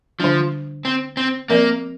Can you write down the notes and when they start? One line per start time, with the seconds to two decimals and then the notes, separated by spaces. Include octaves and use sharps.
0.20 D3 F3 G3 D4
0.85 C4
1.17 C4
1.50 F3 A#3 C4 A#4 D5